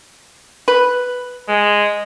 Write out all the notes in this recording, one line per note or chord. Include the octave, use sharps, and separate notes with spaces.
B4
G#3